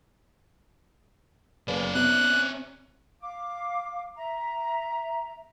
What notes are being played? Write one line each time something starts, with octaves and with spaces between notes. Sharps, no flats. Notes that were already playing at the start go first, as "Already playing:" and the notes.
F#1 C#4 B4 D5
C3 B3 F#6
F5 D6
E5 A#5